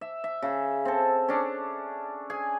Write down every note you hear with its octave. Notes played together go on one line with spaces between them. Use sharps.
E5
E5
C#3
C4 A4
C#4 D4
G#4 G#5